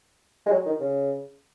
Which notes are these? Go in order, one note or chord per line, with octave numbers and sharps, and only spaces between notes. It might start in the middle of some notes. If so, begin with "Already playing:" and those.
G#3
F#3
D#3
C#3